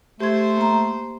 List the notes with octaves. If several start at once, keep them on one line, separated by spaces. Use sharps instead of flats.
A3 G4 C5 G#6
A#3 A#5